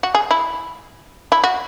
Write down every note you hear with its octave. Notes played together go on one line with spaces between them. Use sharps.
F#4
G#4
E4
E4
F#4